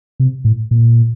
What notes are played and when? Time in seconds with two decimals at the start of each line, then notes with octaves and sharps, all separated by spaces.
0.20 C3
0.45 A2
0.71 A#2